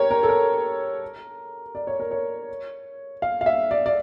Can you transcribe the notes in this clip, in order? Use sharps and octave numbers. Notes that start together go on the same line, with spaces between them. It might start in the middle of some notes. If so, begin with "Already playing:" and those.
Already playing: G4 A#4 C#5
A#4
A4
A#4
D5
C#5
A#4
C#5
F5
F5
E5
D5
D5